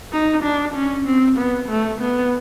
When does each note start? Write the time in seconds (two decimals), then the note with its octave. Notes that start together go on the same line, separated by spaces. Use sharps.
0.13 D#4
0.43 D4
0.74 C#4
1.06 C4
1.38 B3
1.69 A3
2.01 B3